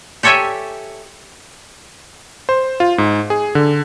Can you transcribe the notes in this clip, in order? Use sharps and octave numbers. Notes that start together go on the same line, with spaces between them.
G4 A4 C#5 E5 G5 G#5
C5
F4
G#2
G#4
D3